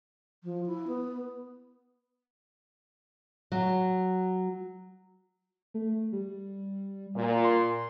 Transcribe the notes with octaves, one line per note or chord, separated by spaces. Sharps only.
F3
E4
B3
F#3
A3
G3
A#2
C6